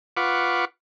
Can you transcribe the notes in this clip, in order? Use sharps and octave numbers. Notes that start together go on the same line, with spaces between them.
F4 B4 F#5 C#6 D6